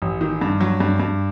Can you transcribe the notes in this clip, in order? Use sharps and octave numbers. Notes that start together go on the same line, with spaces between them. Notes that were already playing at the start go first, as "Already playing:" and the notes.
A1
D#3
G2
F#3
G2
G2